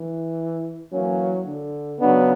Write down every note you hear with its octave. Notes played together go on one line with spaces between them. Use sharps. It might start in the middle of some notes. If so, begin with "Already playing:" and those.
Already playing: E3
E3 F#3 A#3 C#4
D3
C#3 F#3 B3 D4